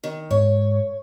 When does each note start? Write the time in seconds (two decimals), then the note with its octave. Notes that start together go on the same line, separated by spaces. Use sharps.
0.04 D#3
0.31 G#2 C#5